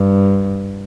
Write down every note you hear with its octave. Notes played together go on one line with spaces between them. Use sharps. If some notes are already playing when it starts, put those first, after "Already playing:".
Already playing: G2